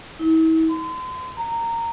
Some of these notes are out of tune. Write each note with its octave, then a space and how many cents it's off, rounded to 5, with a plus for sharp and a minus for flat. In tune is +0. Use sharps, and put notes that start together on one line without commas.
E4 -40
C6 -40
A#5 -15